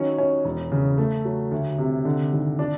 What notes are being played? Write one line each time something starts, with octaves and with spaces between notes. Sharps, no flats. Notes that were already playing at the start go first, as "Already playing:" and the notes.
Already playing: D#3 F#3 C#4
C#4
E1
C#3
A3
F#3
D2
C3
D3
G#1
D4